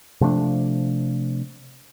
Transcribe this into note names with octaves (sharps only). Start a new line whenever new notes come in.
C3 F3 A3 D4